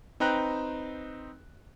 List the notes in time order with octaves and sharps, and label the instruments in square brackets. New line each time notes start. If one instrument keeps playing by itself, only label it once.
[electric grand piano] C4 D#4 B4 G5 A#5 F#6